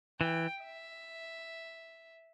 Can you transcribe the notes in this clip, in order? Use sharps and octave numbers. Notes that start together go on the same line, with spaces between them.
E3 G5
E5